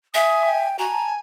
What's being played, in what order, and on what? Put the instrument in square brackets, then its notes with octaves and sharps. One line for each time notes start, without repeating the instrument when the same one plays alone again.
[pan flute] E5 [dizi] G#5 [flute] D#6
[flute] G5
[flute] F#4 [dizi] G#5 [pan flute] A#5
[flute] A5